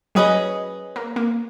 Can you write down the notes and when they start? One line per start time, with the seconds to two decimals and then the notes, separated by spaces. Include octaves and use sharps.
0.15 F#3 C#4 G#4 B4 D#5
0.96 A#3
1.16 A#3